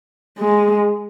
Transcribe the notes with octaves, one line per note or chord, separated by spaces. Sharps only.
G#3